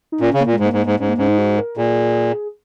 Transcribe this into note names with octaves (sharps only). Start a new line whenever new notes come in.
D#4
A#2 C#4
C#3
A#3
A#2
G#3
G#2
A#3
G#2
G#2
G#2 C#4
A#3
G#2 C#4
D#4
F#4
A#4
A#2 G#4